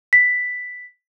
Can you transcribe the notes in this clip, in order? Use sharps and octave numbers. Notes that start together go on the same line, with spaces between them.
B6